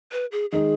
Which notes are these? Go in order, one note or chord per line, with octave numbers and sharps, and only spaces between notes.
B4
G#4
D#3 G#3 D#4 G#4